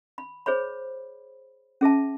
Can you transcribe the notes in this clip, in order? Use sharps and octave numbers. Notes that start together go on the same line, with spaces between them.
B5
G#4 C5 C#5 B5
C#4 G#4 E5 A5